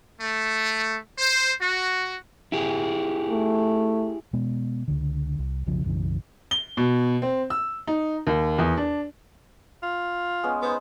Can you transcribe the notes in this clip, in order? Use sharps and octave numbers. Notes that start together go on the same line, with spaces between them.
A3
C5
F#4
E4 G4 G#4
A3
B2 G#3 B3
C#2 D3
C2
B1 F2 C#3 F3
B1 F#2 C#3 E3
G7
B2
C4
E6
D#4
D#2
E2
D4
F4
G#3 B3 C#4
B3 D#4 C5 B5